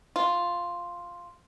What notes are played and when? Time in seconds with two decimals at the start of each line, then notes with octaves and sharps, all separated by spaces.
0.16 F4